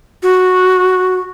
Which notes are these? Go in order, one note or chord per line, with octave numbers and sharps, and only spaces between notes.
F#4